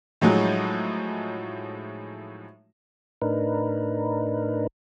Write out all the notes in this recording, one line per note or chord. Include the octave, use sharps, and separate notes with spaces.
A2 F3 F#3 G#3 D#4
A2 D4 D#4 A#4 B4